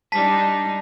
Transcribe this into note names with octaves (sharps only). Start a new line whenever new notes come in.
G3 D4 D#4 A5 B6